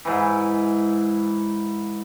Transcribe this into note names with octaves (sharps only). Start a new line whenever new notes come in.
G#2 E3